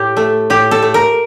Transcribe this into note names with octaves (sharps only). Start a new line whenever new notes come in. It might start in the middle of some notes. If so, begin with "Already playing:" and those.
Already playing: A2 G4
A3
A2 G4
A4
A3
A#4